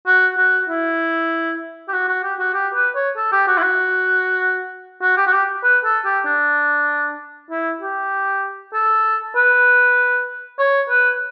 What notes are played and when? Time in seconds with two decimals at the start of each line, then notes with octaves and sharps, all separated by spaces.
0.07 F#4
0.38 F#4
0.69 E4
1.88 G4
1.93 F#4
2.08 F#4
2.23 G4
2.39 F#4
2.54 G4
2.75 B4
2.95 C#5
3.17 A4
3.32 G4
3.48 F#4
3.58 E4
3.63 F#4
5.02 F#4
5.17 G4
5.27 F#4
5.33 G4
5.64 B4
5.85 A4
6.05 G4
6.26 D4
7.50 E4
7.81 G4
8.74 A4
9.36 B4
10.59 C#5
10.90 B4